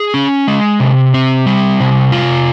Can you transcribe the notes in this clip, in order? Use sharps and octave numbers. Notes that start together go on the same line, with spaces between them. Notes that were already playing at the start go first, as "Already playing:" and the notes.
Already playing: G#4
C#4
G#3
C3
C4
G3
C3
F4